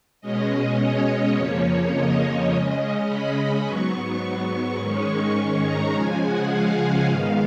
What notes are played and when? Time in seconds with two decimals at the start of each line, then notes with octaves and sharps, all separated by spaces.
0.21 B2 G#3 C#4 D#5
0.79 C#5
1.36 F2 C#3 F3 A#3 C#4
1.93 D#5
2.50 C#3 G#3 C#4
3.07 B5
3.64 G#2 F#3 B3 C#6
4.79 G#2 D#3 G#3 C#4
5.65 A#5
5.94 C#3 F3 G#3 G#5
6.22 F#5
6.51 F5
7.08 G#2 D#3 G#3 B3